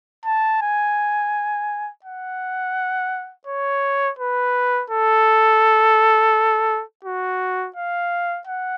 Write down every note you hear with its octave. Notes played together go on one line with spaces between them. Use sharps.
A5
G#5
F#5
C#5
B4
A4
F#4
F5
F#5